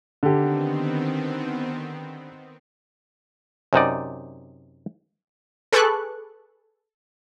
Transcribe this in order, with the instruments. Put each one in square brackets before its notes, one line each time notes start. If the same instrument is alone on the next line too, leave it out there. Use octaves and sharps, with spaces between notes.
[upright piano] D3 G4 [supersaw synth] D#3 B3 C4
[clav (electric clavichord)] F#2 C3 D#4 D5
[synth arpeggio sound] G#4 A4 B4 C#6 D6 F#6